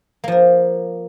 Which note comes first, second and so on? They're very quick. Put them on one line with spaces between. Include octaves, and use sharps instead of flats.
A#3 F3 A#4